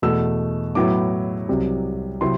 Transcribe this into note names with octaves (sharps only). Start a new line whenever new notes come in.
E2 B2 A3 E6
A2 F#3 B3 E4 D6
C2 C3 F#3
C3 F#3 C4 E4 C6